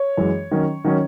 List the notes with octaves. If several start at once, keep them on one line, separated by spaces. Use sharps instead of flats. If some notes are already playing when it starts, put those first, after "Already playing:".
Already playing: C#5
F#2 E3 G#3
D#3 F#3 C#4
D#3 F#3 C#4